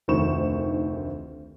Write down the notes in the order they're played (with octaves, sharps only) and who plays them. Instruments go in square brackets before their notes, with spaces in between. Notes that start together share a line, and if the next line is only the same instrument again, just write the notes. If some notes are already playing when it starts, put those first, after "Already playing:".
[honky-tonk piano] F1 D2 D#3 C5 C#6 E7